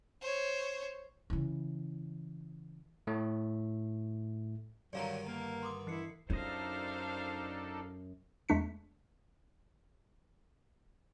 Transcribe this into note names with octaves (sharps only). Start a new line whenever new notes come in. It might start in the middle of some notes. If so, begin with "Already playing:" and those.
C5 C#5
C#3 E3
A2 A3
G2 D3 D#3 F#3 D5 F5 A#5
A#3 A#5
C6 D6 D#6
E3 E4 C7 C#7
F#2 D4 D#4 F4 A4 C5 D#5 F5
E2 G#3 A3 D4 B6 C#7